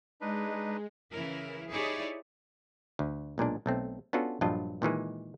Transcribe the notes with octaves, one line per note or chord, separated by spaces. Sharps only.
G#3 D4 D#4 B4
C#3 E3 E4 A#4
D#4 E4 G4 G#4 C#5 D5
D2
B1 A#2 G#3 D4
B1 A3 C4
B3 C#4 D4 F4 F#4 A4
A#1 G2 F#3 D4 F4 D#5
A#2 D#3 E3 G#3